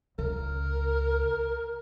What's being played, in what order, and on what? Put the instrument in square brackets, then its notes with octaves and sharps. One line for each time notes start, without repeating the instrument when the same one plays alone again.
[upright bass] C#2 [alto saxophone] A#4